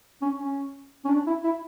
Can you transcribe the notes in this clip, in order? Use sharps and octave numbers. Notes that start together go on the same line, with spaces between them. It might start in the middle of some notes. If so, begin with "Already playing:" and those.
C#4
C#4
C#4
D4
E4
E4